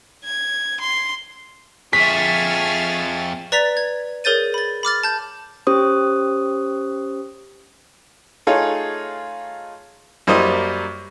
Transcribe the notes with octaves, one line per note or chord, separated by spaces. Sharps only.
G#6
C6
F2 G#4 C#5 E5 C#6 F6 A6 B6
B4 D5 A#5 A6 B6 F7
G#6
G#4 A#4 C#5 G6 A6 D#7
B5 A6
B5 D6 F6 A6
A5 G6
C#4 G4 C5 D#6
A3 D#4 F4 G#4 C#5
F#2 G3 A#3 C5 D#5